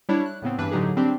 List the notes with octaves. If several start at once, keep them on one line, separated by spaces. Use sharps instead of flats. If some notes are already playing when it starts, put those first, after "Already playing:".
G3 D4 E4 C#5
F#6
A2 C#3 B3 C4
G2 E3 D4 B4
A2 D3 F#3 D#4 G4 G#4
G3 C4 D4 G4